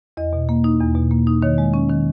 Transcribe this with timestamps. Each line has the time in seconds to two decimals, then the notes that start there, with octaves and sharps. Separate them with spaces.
0.17 E2 D#5
0.33 B2
0.49 A#3
0.64 D#4
0.80 E2
0.95 B2
1.11 A#3
1.27 D#4
1.42 D#3 C#5
1.58 G#3
1.74 C#4
1.90 D#3